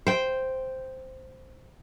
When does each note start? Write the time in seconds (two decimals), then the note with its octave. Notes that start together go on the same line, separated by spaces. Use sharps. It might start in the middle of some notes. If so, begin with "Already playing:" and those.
0.07 C5 G5